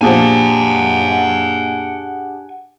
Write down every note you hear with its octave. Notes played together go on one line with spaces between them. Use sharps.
A#2 F3 D4 G4 G#4 F#5 G#5